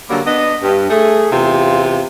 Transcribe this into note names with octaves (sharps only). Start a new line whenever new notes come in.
D3 F#3 G3 A#3
B3 D4 D#5
G2
A3 G#4
E2 C3 F4